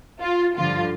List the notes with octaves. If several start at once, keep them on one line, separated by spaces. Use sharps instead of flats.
F4
G2 D3 F3 F4